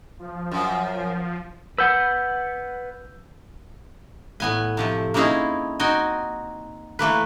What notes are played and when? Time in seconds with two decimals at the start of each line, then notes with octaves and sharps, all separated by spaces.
0.19 F3
0.52 F#2
1.78 B4 F#5 E6 G6
4.40 A2 B3 G#5
4.77 C3 F3 A3
5.14 A#3 C4 C#4 D#4 E4 G#4
5.79 C4 D#4 F#4 G5 G#5
6.99 E3 A3 A#3 B4